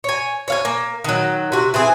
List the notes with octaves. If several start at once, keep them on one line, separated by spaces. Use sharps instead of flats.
C#5 G#5
C#5 F5 G#5
A#3
D#3 F#3
C3 F#4
E3 C4 G#4